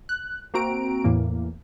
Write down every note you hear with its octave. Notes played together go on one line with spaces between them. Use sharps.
F#6
A#3 C4 F#4 A#5 D7
E2 A2 E3 A#3